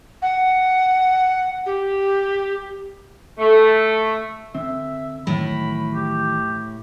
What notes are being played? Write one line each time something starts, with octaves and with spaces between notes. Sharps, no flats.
F#5
G4
A3
D3 C4 E5
A2 D#3 E3 F#3 B5
G4